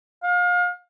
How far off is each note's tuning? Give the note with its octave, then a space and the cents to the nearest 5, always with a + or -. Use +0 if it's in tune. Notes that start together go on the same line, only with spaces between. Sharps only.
F5 +35